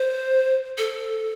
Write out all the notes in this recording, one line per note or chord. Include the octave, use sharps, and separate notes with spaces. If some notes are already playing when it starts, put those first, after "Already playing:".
Already playing: C5
A4